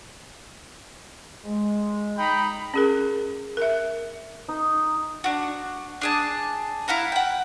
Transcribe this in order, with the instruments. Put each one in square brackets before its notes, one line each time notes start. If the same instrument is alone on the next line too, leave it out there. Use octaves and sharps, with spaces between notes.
[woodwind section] G#3
[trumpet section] D#4 G5 B5
[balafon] C#4 G#4 A#4
A#4 E5
[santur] D#4
[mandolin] D4 F#4
D4 G#4 A5
E4 F5 F#5 A#5
F#5 G5